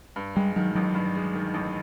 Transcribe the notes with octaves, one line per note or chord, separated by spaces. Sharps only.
G2
G3 G#3
D#3 F#3
A1 F#3
G2
G#3
D#3
A1